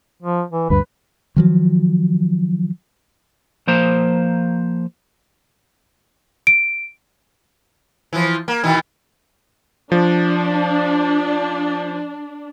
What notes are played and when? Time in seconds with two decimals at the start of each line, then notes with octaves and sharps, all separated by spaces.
0.23 F3
0.52 E3
0.70 D2 G2 B4
1.36 D#3 F3 F#3
3.67 F3 A#3 C5 A#5
6.47 D7
8.13 E3 F3
8.48 A#3
8.63 B2 D#3 E3
9.92 F3 D4